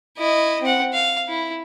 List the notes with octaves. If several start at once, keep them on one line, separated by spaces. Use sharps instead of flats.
E4 D#5
C4 F#5
F5
E4